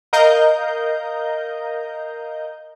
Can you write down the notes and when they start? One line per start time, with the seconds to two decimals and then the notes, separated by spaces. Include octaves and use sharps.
0.13 A#4 D#5 F5 A#5 G6